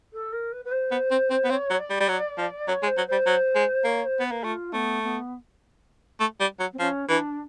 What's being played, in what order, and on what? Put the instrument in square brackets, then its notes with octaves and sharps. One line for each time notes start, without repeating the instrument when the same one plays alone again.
[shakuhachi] A4
A#4
B4
B4
C5
[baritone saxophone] B3
C4
C4
B3
[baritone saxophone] C4 [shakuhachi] C#5
[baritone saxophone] F#3
[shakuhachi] D5
[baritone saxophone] G3
G3
F#3
F3
[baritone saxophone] F#3 [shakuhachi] C#5
[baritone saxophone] G#3
[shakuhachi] C5
[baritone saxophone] F#3
[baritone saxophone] G3 [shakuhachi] C5
[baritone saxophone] F#3
G#3
[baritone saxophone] A#3 [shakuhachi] C#5
[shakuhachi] C5
[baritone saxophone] B3 [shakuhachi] B4
[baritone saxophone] A#3
[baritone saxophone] A3 [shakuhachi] F4
[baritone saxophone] A3 [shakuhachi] B3
[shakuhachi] B3
[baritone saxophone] A3
G3
F#3
[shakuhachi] C4
[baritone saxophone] F3 [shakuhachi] C#4
[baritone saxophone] E3 [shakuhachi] D4